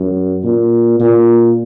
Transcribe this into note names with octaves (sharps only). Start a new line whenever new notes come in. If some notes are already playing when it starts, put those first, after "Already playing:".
Already playing: F#2
A#2
A#2